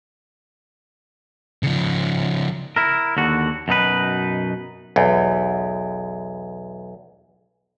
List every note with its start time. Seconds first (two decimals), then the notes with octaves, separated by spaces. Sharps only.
1.63 C#3 F3
2.76 E4 A#4
3.17 D#2 D3 F#4
3.68 F#2 B2 D#4 B4
4.96 B1 E2